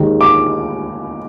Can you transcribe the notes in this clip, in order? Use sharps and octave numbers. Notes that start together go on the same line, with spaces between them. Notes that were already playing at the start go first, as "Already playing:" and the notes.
Already playing: D#2 D#3 G#3
D6